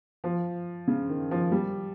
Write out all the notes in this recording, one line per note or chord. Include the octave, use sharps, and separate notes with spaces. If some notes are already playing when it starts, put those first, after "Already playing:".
F3
C#3
D#3
F3
G3